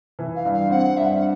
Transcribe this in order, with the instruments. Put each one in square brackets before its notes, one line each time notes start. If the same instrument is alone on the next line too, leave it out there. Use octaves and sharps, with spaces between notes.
[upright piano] E3
[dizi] F5
[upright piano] G2
[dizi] F5
[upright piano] C4 [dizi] F#5
[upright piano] G2 [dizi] E5
[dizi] F#5